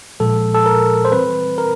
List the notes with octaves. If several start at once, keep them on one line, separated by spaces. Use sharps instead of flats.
A#2 F3 G#3 A4
A4
A#4
C5
E3 G3 C4 B4
A#4